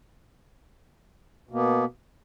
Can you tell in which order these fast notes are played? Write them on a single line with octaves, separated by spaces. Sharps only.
B2 A#3 B3